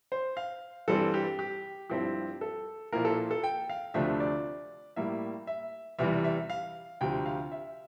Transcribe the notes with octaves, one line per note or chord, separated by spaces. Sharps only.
C5
F5
G2 E3 G3 C4 A4
G4
G4
G2 F3 C4 E4 G4
A4
A#2 F3 A#3 E4 A#4
A4
A4
G5
F5
D2 C3 F3 A3 D4 E5
D5
A2 G3 A#3 E4 E5
E5
E2 C3 E3 G3 E5
E5
F5
D2 C3 F3 G5
F5
E5